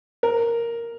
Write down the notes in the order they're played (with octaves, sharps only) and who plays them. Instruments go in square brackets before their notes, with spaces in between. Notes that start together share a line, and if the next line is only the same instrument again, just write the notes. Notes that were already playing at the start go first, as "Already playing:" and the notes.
[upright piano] A#4